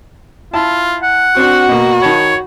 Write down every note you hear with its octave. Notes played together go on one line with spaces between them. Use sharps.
E4 F4 A5
F#5
C4 D4 F#4
B2 A#3
D#3 C#5 A5 B5